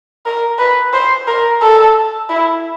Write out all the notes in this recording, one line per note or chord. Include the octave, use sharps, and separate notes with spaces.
A#4
B4
C5
A#4
A4
E4